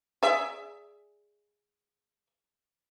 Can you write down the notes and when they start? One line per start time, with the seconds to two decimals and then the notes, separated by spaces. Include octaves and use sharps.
0.23 G#4 D5 E5